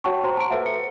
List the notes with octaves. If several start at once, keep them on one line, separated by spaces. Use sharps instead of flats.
F#4 C#5 F#5 G5 A5 C#6
F#4 C5 A#5 C6
A5 A#5 D7
A4 B4 C5 E5 F#5
C#7